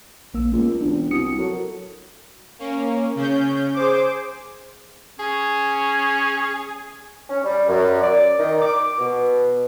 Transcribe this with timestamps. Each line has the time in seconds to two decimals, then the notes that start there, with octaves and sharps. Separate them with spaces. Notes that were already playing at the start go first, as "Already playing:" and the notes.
0.34 A#1 A#3 E6
0.52 C#2 A#3
0.81 E1 D4
1.11 C2 F#4 D#6 C#7
1.39 F#3 A4 A#4 C#5
2.59 A#3 C#4
3.15 C#3 C#4 G6
3.74 G#4 C5 D6
5.19 C#4 G#4
7.29 C#4
7.44 G3
7.69 F#2
8.01 D5
8.39 D#3
8.62 D6
8.98 B2